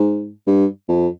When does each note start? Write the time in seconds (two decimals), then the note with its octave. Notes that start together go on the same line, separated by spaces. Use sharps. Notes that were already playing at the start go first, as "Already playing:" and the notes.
Already playing: G#2
0.47 G2
0.89 F2